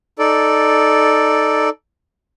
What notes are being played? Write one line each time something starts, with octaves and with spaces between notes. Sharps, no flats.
D#4 A4 D5